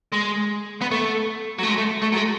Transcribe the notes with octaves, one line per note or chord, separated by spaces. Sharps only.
G#3
B3
A3
F#3
A3
G#3
A3
A3
F#3
G#3